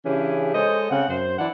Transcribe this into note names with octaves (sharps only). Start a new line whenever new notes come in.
C#3 E3 C#4 D4 G4 G#4
G#3 A4 C5 C#5 D#5
C#3 C4 C#4 F#5
F#2 C5
E3 D4 E4 D5 F#5